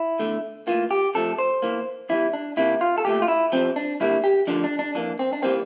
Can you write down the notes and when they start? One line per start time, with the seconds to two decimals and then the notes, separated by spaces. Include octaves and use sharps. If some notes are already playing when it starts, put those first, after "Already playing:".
Already playing: E4
0.19 E2 D3 A3
0.67 A2 E3 A#3 F4
0.91 G4
1.14 F2 C3 F3 A3 A4
1.39 C5
1.62 E2 E3 A#3
2.09 E2 E3 G3 E4
2.33 D4
2.57 C2 C3 G3 A#3 E4
2.81 F4
2.98 A4
3.05 C2 A#2 A3 G4
3.22 F4
3.28 E4
3.52 C2 C3 F3 C4
3.76 D4
4.00 G2 D3 G3 A#3 E4
4.24 G4
4.47 D2 D3 F3 D4
4.64 D4
4.79 D4
4.95 F2 E3 A#3 D4
5.19 C4
5.33 D4
5.42 E3 G3 A#3 C4